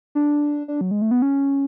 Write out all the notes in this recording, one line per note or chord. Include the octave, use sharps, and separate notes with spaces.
D4
D4
F#3
G#3
A3
B3
C#4